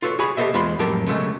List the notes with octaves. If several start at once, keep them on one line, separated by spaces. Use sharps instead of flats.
F4 F#4 A4 B4 C#5
F#4 G#4 C#5 G#5 B5
G4 A4 A#4 C5 D#5 E5
E2 G#3 F4 C5 B5
F2 A2 F#3 G4 A#4 A5
C#3 F#3 G#3 A3 C#4